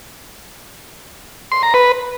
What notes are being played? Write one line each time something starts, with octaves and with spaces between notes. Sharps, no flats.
C6
A#5
B4